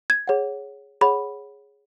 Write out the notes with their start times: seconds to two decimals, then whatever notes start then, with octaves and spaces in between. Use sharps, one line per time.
0.10 G#6
0.28 G#4 C#5 F#5
1.01 G#4 C#5 F#5 B5